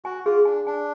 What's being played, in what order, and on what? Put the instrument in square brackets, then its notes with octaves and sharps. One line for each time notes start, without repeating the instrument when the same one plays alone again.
[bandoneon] F#4 [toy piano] G#5
[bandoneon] F4 [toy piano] G#4
[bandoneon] D4 [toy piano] G#5
[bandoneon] D4 [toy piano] G#5